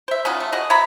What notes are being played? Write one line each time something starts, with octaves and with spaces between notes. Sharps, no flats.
C5 E5
C#4 D#4 F4 F#4
A3
F#4 G#4 D#5
C#5 E5 A#5 B5